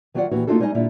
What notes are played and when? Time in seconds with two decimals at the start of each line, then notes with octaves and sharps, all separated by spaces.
0.14 D#3 F#3 F4 B4 D5 F#5
0.31 D#2 A#2 E3 F#4
0.47 A3 A#3 D#4 F4 F#4 A4
0.60 G3 G#3 D#4 B4 D#5 G#5
0.74 A#2 D3 G3 E4 F4